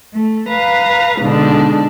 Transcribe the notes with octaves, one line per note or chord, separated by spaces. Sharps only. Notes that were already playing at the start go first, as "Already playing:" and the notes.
A3
B4 F5 A#5
G#2 B2 D3 D4